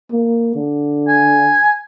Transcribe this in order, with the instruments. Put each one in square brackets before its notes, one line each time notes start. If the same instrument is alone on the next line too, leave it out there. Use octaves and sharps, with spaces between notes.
[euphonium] A#3
D3
[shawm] G#5